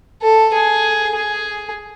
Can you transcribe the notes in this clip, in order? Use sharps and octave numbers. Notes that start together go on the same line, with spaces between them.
A4
G#4
G#4